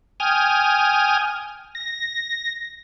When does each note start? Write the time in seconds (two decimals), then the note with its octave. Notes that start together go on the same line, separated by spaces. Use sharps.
0.20 G5 G#5 D#6 F6
1.75 A#6